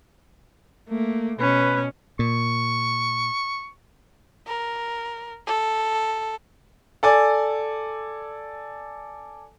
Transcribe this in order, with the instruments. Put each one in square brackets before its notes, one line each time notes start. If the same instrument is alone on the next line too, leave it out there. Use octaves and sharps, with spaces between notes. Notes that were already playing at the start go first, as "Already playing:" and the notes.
[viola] A3 [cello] A#3
[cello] B2 [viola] C#4 [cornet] B4
[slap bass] A#2 [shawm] C#6
[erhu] A#4
A4
[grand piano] A4 D5 G#5